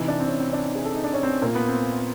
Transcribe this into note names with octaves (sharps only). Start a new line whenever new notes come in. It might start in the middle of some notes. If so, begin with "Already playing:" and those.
Already playing: C3 E3 D#4
D4
C4
C#4
C4
D4
D#4
G#4
A4
D#4
D4
C#4
C4
A#2 A#3
B3
C4